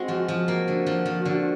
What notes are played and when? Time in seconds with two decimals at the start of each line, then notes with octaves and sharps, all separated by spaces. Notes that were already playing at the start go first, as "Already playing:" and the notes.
Already playing: G#3 C4 F#4
0.08 F3
0.28 F3
0.48 A#3 F#4
0.68 D3
0.86 F3
1.05 F3
1.25 D3